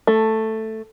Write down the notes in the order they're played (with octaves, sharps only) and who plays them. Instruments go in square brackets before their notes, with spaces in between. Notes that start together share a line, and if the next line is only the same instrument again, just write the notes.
[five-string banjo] A3